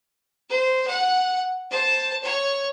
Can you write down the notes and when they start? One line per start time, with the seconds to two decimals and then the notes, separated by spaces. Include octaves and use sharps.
0.49 C5
0.87 F#5
1.71 C5 A5
2.23 C#5